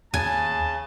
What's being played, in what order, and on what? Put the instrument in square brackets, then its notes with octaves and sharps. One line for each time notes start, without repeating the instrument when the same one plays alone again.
[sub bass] D#2 [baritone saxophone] C#3 [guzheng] G#5 [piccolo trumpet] A5